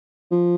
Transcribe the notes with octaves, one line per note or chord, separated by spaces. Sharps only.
F3